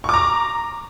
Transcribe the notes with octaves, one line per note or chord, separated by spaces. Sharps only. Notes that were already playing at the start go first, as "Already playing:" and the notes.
A#5 C#6 D6